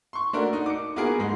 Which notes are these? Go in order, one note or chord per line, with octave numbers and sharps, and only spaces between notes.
C6 C#6
A3 A#3 D4 F#4 A#4
D#4
D6 C#7
A#3 B3 F4 F#4 G#4 A#4
G#2 G#3 D#4